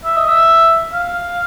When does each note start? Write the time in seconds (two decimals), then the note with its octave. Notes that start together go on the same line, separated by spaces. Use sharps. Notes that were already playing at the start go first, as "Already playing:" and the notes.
0.05 E5
0.17 D#5
0.28 E5
0.93 F5